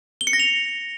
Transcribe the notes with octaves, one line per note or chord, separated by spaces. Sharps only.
G7
C#7
A#6
F7